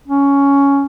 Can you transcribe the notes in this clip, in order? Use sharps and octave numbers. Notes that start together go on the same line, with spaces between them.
C#4